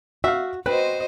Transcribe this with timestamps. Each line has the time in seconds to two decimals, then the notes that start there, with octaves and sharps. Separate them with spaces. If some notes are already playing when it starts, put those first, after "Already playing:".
0.24 F#4 E5 F5
0.66 C4 F#4 B4 C5 D#5